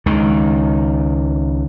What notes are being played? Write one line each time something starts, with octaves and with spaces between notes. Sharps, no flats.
C#2 D#3